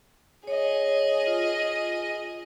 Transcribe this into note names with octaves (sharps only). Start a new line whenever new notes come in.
G#4 C#5 D#5
F4